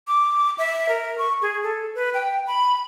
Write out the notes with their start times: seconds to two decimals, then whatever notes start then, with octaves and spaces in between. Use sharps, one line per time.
0.08 D6
0.58 E5
0.89 A#4
1.18 C#6
1.42 G#4
1.63 A4
1.95 B4
2.14 G5
2.47 B5